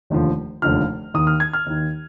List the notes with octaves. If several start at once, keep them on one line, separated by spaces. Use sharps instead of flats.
F1 D#2 D3 F3
F1 D#2 D3 F3 F6
D#2 D#3 D#6
F6
G#6
F6
D#2 D#3